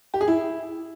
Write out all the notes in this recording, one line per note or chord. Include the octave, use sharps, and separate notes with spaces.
G4
G#4
E4